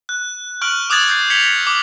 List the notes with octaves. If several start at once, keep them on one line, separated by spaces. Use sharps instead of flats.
F#6
C#6 F6 F#6 D7 F#7
D6 D#6 F#6 G#6 A6 F#7
F#6 G6 A6 C7
G#6 B6 C#7 F7 G7
D6